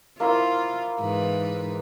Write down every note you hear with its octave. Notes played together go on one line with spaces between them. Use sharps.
A#3 E4 F4 C5
G#2 E3 B4